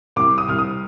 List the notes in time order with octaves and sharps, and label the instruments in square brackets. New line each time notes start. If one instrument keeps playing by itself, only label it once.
[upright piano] C2 [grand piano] D6
[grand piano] D#6
[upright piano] C2 [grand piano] F6
[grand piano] D#6